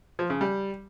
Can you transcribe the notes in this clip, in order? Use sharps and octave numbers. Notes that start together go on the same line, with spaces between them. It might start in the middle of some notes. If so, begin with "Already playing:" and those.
F3
C#3
G3